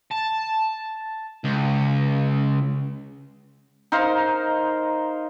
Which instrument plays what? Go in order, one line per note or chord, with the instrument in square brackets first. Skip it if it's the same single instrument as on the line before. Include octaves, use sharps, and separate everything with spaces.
[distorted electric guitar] A5
C#2
[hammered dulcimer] D#4 A#4 C5 F5